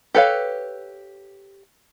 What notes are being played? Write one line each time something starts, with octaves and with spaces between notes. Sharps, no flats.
G4 A4 B4 C#5 F5